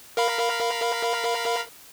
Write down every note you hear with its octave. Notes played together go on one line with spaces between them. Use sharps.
A#4 F5 B5